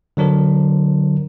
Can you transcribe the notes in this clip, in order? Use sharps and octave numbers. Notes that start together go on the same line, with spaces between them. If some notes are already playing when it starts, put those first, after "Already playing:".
D3 F#3 D4 A#4 C5